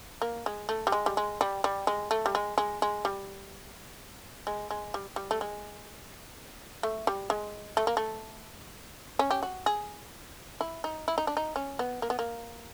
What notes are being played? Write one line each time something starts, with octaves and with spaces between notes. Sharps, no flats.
A#3
G#3
A3
G3
G#3
G3
G#3
G3
G3
G#3
A3
G3
G#3
G#3
G#3
G3
G#3
G#3
G3
G3
A3
G#3
A3
G3
G#3
A3
A#3
A3
C#4
G4
F#4
G#4
E4
D#4
E4
D#4
D4
D#4
C#4
B3
A#3
B3
A#3